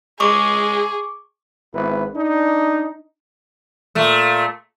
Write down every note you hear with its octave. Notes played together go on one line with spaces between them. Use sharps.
G#3 G#4 C#6 D6
G#1 B3 E4 B4
D4 D#4
A#2 A3